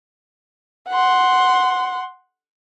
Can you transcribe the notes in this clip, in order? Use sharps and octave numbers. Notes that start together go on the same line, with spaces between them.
F#5 C6